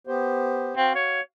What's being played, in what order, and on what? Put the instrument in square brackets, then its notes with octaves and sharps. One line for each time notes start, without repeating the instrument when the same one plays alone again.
[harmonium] B3 G4 C5
[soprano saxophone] C4 [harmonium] F#4 F5
[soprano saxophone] C#5